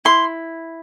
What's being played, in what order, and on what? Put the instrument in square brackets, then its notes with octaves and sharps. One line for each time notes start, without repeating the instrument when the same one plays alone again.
[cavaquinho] E4 C6